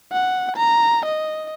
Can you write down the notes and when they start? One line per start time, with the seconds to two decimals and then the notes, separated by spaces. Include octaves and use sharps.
0.13 F#5
0.56 A#5
1.05 D#5